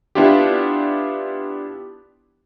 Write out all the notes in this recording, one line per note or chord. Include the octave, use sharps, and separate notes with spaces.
B3 D4 E4 F4 G4